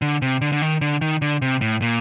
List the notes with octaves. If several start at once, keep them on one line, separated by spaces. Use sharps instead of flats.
D3
C3
D3
D3
D#3
D3
D#3
D3
C3
A2
A#2